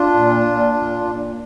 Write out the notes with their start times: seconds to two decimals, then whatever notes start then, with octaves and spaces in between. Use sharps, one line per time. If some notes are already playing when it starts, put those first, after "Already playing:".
Already playing: D4 F4
0.13 A#2
0.44 A#2
0.74 A#2
1.05 A#2